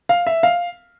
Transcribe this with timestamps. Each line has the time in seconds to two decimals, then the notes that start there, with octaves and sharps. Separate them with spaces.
0.09 F5
0.27 E5
0.43 F5